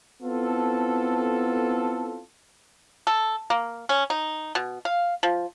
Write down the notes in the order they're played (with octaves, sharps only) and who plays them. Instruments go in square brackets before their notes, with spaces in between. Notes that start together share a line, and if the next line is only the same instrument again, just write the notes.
[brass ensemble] B3 C4 E4 F4 A4
[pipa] A4
A#3
C#4
D#4
B2
F5
F3